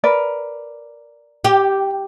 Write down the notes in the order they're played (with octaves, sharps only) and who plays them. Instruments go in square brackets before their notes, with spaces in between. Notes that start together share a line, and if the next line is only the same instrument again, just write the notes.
[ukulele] A#4 B4 D5
[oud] G4